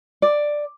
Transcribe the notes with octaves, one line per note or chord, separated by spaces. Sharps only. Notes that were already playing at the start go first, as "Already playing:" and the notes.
D5